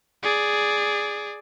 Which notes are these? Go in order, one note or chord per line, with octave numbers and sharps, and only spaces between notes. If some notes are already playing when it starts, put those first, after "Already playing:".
G#4 D5